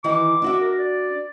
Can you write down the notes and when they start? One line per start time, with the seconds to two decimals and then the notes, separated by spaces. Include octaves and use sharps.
0.04 D#3 E3 E4 D6
0.42 D4 F#4 E5
0.61 A#4
0.78 D5